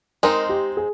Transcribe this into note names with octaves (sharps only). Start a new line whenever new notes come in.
G#3 C4 D#4 A#4
G4
G#4